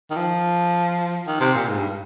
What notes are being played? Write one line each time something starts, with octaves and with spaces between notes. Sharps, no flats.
D#3
F3
D#3
C3
A#2
G#2
G2